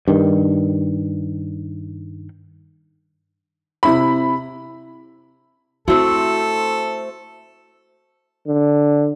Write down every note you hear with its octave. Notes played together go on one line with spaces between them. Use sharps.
G2 D#3
C3 E4 B5
A3 C4 E4 F#4 A4
D3